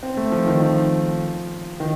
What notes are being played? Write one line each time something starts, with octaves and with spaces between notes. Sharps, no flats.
C4
A3
F3
D#3
F3
D#3